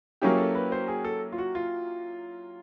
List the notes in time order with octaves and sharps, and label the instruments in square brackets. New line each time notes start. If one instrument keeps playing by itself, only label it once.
[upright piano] F#3 A#3 C#4 E4 G4 [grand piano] G#4
[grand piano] A4
B4
C5
G#4
A4
F4
F#4
F4